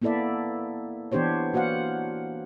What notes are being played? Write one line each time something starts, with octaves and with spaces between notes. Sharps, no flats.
A#3 B3 E4 A4 D5 E5
E3 B3 D4 G4 C5 C#5
A#3 F#4 C5 F5 F#5